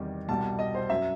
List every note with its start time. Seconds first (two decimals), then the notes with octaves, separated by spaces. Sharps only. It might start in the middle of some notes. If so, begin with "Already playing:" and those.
Already playing: E2 C3 D#3 G3
0.28 C2 B2 G3 A5
0.59 D#5
0.75 C5
0.90 F#2 F#3 E5